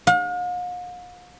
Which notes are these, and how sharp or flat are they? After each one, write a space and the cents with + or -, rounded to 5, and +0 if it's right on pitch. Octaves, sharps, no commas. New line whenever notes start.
F5 +45